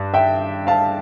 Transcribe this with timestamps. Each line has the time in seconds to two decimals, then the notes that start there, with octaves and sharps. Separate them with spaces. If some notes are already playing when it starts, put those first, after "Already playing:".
Already playing: G2
0.14 E5 G5
0.67 F5 A5